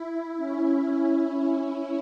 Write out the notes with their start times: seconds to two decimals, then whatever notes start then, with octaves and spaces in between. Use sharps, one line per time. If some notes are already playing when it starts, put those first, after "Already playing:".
Already playing: E4
0.37 C#4